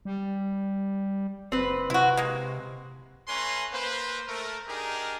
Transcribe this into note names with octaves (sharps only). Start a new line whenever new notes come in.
G3
F#1 C4 B4
C3 E4 F#4
G#3 A#3
A3 C#4 B4 G#5 A#5 C6
A#3 B4 C5
A3 A#4
D4 D#4 G4 G#4 A#4